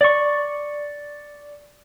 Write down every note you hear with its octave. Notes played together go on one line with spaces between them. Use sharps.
D5 C#6